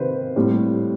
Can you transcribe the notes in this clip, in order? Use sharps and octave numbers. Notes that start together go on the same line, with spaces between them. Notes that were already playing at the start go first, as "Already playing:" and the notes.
Already playing: C3 D#3 B4 C5
A2 G3 C4